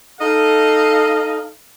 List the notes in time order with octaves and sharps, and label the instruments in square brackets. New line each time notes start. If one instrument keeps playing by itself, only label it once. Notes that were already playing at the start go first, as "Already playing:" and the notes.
[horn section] D#4 A4 D#5 F5